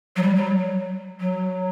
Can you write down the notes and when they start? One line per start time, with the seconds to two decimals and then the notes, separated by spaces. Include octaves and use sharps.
0.16 F#3
0.23 G3
0.35 F#3
1.20 F#3